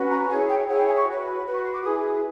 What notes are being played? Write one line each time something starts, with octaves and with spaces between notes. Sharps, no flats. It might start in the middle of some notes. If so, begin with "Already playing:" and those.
Already playing: C#4 F#4 B4
A#5
E4 G#4 C#5 G#5
G5
E4 G#4 C#5 F#5
G5
G#5
C#6
F#4 B4
F#4 B4
C#6
C6
D6
E4 G#4 B4 D#6